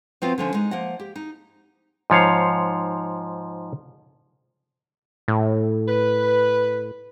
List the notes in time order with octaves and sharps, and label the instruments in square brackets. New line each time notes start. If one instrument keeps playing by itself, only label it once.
[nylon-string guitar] F3 B3 C4 F4 F#4
D3 F3 C#4
G#3 D#4
F3 A#3 D#5 F#5
G4
D#4
[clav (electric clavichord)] G#2 F3 C#5 F5
[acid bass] A2
[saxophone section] B4